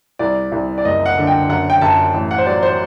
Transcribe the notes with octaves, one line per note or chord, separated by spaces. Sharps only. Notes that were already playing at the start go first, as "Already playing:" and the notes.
C2 D5
C2
D5
F#1 D#5
F#5
D3
G5
F#2 F#5
G5
F#2 A5
A1
F#5
C5
F#3 D5
C5